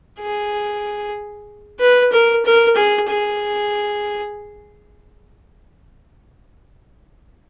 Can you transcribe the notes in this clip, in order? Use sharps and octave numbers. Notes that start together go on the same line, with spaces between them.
G#4
B4
A#4
A#4
G#4
G#4